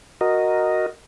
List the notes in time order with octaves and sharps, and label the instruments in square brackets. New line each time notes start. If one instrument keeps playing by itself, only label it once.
[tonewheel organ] F#4 A#4 D#5